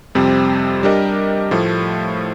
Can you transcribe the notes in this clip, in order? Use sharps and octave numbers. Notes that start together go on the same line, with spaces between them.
F2 C3 G3 C4
G3 D4 G4 A#4 D#5
A2 F3 A3